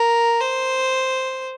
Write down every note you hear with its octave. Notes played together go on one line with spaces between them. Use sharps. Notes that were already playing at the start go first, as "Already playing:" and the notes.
Already playing: A#4
C5